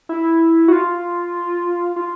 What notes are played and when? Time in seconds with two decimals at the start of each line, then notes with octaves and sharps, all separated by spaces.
0.09 E4
0.68 F#4
0.72 F4
1.96 F4